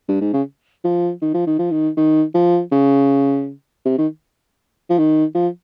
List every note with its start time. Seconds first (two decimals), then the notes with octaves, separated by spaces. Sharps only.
0.08 G2
0.21 G#2
0.33 C#3
0.84 F3
1.21 D#3
1.34 F3
1.47 D#3
1.59 F3
1.71 D#3
1.97 D#3
2.34 F3
2.72 C#3
3.85 C3
3.98 D#3
4.89 F3
4.98 D#3
5.35 F3